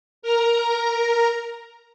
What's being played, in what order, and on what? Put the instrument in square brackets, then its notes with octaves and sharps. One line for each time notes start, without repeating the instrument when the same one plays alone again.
[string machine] A#4 A#5